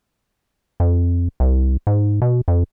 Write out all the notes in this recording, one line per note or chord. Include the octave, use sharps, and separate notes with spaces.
F2
C2
G#2
B2
F2